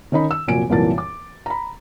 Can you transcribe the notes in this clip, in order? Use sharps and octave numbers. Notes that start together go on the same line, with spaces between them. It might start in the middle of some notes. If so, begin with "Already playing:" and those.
D#3 C#4 D#4 B5
E6
F1 A#2 F#3 G#5 D7
C2 F#2 A#2 E3 A5 A6
D6
A#5 B5